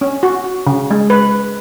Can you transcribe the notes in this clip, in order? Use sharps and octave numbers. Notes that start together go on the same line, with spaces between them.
C#4
F#4
C#3
G#3
B4